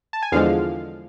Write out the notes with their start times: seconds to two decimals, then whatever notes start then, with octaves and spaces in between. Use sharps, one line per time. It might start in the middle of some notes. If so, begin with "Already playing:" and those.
0.13 A5
0.22 G#5
0.32 E2 D3 F3 G#3 F5